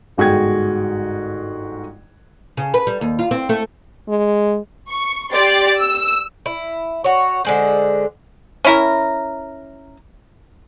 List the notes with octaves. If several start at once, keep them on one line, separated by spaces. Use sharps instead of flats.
G1 G#2 F#4 G#4 G5 G#6
C#3
B4
G3
D#2
F4
C4
A3
G#3
C#6
G4 D5 C6 A6
E6
E4
F#4 C#5
D3 G#3 C5
C#4 E4 A#4